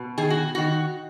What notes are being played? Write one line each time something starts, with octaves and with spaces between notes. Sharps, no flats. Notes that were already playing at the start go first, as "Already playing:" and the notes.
Already playing: B2
D#3 G#4
F#4
D#3 F#4